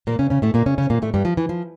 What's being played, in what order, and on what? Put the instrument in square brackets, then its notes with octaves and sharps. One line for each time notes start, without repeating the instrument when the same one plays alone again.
[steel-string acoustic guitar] A#2 A#3
C#3 C#4
C#3 C#4
A2 A3
A#2 A#3
C#3 C#4
C#3 C#4
A#2 A#3
A2 A3
G2 G3
F3
E3
F3